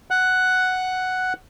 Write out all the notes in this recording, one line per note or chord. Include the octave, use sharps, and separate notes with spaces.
F#5 F#6